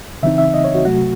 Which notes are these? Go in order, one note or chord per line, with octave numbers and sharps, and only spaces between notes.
C#3 E3 C4 D#4 E5
E5
D#5
C#5
F#4
C2 C3 F#3 A3 F#4